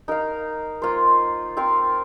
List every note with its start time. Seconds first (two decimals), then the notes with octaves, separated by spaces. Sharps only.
0.08 D#4 A#4 F5
0.82 A#3 F4 C5
1.57 C4 F4 A#4 F5